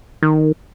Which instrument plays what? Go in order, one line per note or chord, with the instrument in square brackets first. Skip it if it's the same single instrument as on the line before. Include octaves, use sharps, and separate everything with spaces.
[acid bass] D#3